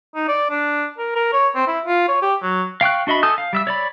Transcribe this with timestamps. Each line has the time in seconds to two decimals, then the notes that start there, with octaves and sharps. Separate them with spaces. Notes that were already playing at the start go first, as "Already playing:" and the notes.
0.15 D#4
0.28 D5
0.50 D4
0.98 A#4
1.16 A#4
1.33 C#5
1.55 C4
1.67 E4
1.86 F4
2.08 C#5
2.22 G4
2.42 F#3
2.81 F5 G5 C#6 F#6
3.07 D4 F#4 D#5 E5 B5
3.23 A4 G#5 A5 D#6 G6
3.38 F5
3.53 G3 E5 E6
3.67 C#5 D5 B5